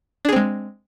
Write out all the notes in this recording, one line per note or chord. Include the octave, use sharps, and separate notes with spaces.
G#3 C4 D4 G#4